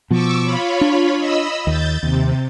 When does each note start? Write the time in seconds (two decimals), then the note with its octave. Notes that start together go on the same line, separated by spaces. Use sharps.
0.11 B2 F3 C#6 D6 E6
0.42 F4 C#5 B5
0.81 D4
1.18 D#5 B5 E6
1.67 D#2 G6 A6
2.03 D#2 C3